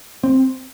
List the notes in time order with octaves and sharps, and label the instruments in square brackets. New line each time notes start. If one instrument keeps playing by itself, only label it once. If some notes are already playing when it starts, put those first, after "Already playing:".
[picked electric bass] C4